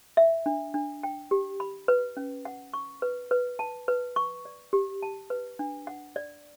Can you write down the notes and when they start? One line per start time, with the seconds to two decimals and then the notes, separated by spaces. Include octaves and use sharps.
0.17 E5
0.46 D4
0.74 D4
1.03 G5
1.31 G4
1.60 B5
1.88 B4
2.17 C#4
2.45 F#5
2.74 C#6
3.02 B4
3.31 B4
3.59 A5
3.88 B4
4.16 C#6
4.45 D5
4.73 G4
5.03 A5
5.30 B4
5.59 D4
5.87 F#5
6.16 D5